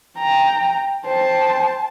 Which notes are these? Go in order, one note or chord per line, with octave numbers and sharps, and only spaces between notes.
G5 A#5
C5 G5 A5